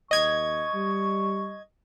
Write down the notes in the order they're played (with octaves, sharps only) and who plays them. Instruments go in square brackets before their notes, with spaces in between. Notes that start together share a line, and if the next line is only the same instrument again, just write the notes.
[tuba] D#2 [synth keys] D#5 G#6 [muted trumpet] C#6
[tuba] G3